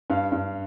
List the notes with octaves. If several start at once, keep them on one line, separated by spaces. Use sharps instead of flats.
G2 F5
G2